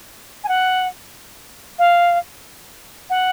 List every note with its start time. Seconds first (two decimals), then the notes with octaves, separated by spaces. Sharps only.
0.44 G#5
0.48 F#5
1.79 F5
3.10 F#5